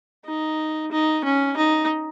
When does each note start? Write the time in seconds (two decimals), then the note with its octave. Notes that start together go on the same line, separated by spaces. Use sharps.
0.25 D#4
0.92 D#4
1.25 C#4
1.57 D#4